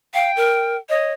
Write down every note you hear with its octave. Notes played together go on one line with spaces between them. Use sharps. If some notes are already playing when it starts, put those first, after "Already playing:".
F5 G5
A#4
C#5 D#5